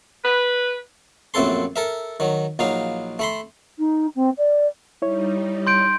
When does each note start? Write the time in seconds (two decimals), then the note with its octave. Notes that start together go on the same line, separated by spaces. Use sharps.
0.24 B4
1.34 A#1 F#2 A3 C4 A4 C6
1.76 A4 A#4 E5
2.20 D#3 F#3
2.59 A#1 F#3 D#4 F5
3.19 A3 B5 C6
3.79 D#4
4.15 C4
4.37 D5
5.02 G3 D#4 E4 C#5
5.67 C6 G6 D7